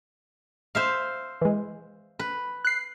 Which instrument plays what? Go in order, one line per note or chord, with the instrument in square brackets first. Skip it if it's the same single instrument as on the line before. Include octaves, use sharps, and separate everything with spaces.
[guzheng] C5 E5 F5
[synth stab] E3 G#3
[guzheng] B4
[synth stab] F#6 C7